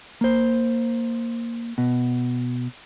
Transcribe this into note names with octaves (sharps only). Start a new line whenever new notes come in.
A#3 C5
B2